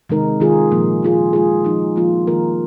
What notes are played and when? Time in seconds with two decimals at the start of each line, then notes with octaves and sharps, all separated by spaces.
0.09 C3 D#3 G#3 D#4 A#4
0.40 D#3 G#3 F4 G#4
0.71 A#2 F3 A#3
1.03 G#3 F4 G#4
1.33 G#3 F4 G#4
1.65 F3 G#3 D#4
1.96 F3 A#3 F4
2.27 D#3 A#3 F4 A#4